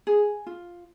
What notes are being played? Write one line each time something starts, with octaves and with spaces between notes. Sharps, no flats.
G#4
F4